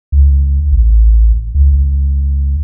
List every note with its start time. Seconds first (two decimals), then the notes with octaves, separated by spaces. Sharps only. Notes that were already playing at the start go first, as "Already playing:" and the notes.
0.12 C#2
0.71 A1
1.55 C#2